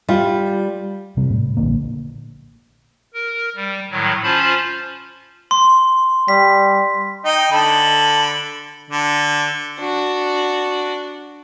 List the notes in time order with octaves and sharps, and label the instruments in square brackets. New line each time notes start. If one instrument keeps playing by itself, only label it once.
[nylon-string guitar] G3 [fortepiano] F4
[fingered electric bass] C3 G3
A2
A#1 A#2 D3 A#3
[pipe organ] A#4
G3
A2 D#3 F#3
C#4 F4 C5 A5 B5
[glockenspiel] C6
[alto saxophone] G3 [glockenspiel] B6
[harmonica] D#4 D#5 G5
D3 A4 B5
D3
[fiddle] D4 F#4